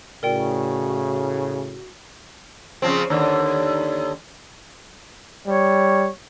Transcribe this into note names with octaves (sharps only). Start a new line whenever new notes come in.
A2 C#3 F#4 A#4 D5 G5
C#3 F3 C4
D#2 D3
G3 C#5